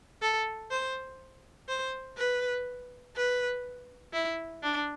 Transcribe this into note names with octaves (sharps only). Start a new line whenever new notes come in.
A4
C5
C5
B4
B4
E4
D4